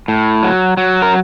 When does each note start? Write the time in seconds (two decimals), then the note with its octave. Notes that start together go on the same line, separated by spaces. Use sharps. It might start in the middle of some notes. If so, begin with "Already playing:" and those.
0.08 A2
0.43 F#3
0.77 F#3
1.02 A#4